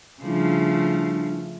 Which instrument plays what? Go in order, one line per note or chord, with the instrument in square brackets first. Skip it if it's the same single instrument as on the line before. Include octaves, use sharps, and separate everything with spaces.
[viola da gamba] C#3 F3 A3 [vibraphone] G3 D4 E4